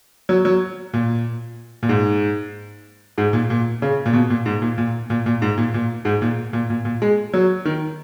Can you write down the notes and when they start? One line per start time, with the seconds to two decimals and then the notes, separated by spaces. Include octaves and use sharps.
0.29 F#3
0.45 F#3
0.94 A#2
1.83 A#2
1.89 G#2
3.18 G#2
3.33 A#2
3.50 A#2
3.82 C#3
4.06 A#2
4.13 B2
4.30 A#2
4.46 G#2
4.62 A#2
4.78 A#2
5.10 A#2
5.26 A#2
5.42 G#2
5.58 A#2
5.74 A#2
6.05 G#2
6.22 A#2
6.53 A#2
6.70 A#2
6.85 A#2
7.02 G#3
7.34 F#3
7.65 D#3